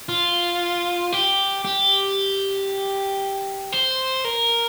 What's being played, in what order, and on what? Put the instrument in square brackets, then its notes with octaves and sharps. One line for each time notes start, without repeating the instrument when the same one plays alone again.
[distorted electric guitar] F4
G4
G4
C5
A#4